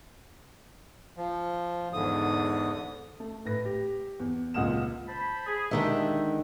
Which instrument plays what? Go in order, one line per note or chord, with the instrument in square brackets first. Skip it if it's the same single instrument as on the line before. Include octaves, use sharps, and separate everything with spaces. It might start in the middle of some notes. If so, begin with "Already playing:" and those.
[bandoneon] F3
E2 G#2 D3 D#6
[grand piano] A3
A2 B4 A#6
G4
E2
C#2 A#2 F#5 D#6 F6 E7
[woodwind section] C5 A5 B5
G#4
[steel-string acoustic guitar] D3 D#3 G#3 [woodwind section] A#3 G4 E5